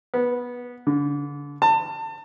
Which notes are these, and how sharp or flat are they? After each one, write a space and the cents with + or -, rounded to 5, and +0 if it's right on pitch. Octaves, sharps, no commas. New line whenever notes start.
B3 -15
D3 -30
A5 +30